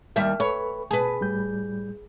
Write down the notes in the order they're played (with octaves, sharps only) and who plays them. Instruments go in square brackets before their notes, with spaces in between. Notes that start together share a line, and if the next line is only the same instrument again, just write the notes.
[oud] D#2 G3 E5 [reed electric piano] A#4 F6
[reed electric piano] A4 B4 B5 [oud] C#5
[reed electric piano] B2 A5 [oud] G#4 B4
[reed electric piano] A2 G3 G6